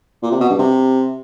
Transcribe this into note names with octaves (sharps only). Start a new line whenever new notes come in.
A#2
C3
B2
G2
C3